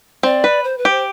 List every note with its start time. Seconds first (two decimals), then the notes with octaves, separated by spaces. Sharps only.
0.23 C4 D5
0.44 B4
0.64 C5
0.78 B4
0.85 G4
0.90 C5